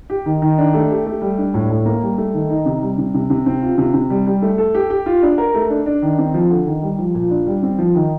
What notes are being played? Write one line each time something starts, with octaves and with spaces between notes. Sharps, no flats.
G4
D#3
D#3
D4
A3
G4
A3
G3
D4
A2
A2
A#3
G3
A3
D#3
D#4
C3
G3
C3
C3
C3
C4
F4
C3
C3
G3
G3
A3
A4
G4
G4
F4
D4
A#4
A3
D4
D4
D#3
C4
F3
D3
D#3
G3
F3
A#2
D4
G3
C4
F3
D#3